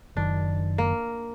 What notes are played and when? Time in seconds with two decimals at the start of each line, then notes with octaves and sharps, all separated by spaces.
0.16 F#1 F#2 D#3 D4
0.78 A#3